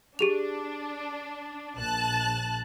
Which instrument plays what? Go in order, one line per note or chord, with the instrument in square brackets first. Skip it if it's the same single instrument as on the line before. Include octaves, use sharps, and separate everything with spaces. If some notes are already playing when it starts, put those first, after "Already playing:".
[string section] D4 [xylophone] G4 G#4 F7
[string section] A#1 A5 F#6